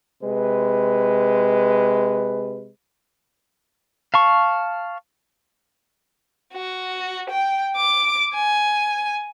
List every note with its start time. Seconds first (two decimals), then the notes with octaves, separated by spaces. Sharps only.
0.22 C3 G#3 B4
4.14 F5 A5 C#6
6.53 F#4
7.30 G5
7.76 D6
8.34 G#5